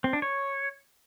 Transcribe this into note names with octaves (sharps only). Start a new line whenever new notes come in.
C4
D4
C#5